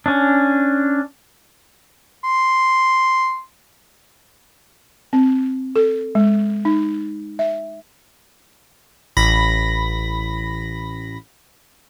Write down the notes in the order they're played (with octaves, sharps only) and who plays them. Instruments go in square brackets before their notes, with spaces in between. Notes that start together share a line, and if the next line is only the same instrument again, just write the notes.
[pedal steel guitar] C#4 D4
[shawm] C6
[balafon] C4
A4
G#3
D#4
E5
[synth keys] A1 B5 A#6